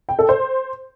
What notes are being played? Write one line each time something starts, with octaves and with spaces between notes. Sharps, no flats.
G5
A4
C5